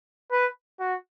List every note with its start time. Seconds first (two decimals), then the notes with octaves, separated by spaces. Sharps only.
0.32 B4
0.80 F#4